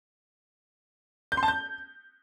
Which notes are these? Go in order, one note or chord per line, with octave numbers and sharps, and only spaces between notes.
G6
C6
A5
G6